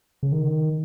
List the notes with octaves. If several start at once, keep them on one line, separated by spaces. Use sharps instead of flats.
C#3
D#3